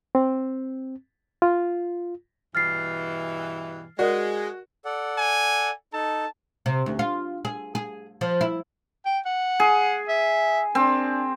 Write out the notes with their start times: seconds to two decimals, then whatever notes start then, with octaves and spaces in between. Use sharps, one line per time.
0.15 C4
1.42 F4
2.55 G2 B2 E3 F6 A6 C7
3.99 G#3 F#4 A#4 D5
4.85 A4 D5 F#5
5.18 G#5
5.93 D#4 A4 A5
6.66 C3
6.86 D2
6.99 F4
7.45 G#4
7.75 G#4
8.21 F3
8.41 E4
9.06 G5
9.26 F#5
9.60 G#4
10.08 E5
10.75 C4 D4